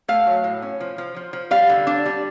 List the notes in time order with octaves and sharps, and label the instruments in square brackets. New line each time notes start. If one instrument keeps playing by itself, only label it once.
[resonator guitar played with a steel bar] A3 F5
F#3
A2
C#4
F3
F3
F3
F3
G3 F5
D3
D4
G3